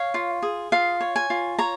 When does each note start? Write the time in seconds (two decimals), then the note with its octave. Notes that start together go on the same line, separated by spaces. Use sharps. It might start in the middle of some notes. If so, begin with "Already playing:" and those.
Already playing: C#5 F5
0.14 F4
0.42 G#4
0.72 F4 F5
1.01 C#5
1.16 G#5
1.30 F4
1.59 C#5 A#5